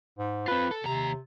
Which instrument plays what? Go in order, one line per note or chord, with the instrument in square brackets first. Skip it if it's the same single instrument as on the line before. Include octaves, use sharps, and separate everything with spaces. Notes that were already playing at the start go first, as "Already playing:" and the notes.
[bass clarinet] G#2
[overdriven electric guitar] C4 F4 [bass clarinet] B4
[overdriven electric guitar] A4
[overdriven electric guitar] D#2 A#5 [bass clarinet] C3